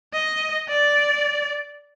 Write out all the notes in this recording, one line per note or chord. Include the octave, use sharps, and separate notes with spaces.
D#5
D5